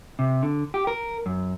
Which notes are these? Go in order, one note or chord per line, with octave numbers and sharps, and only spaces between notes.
C3
D3
G4
A#4
F#2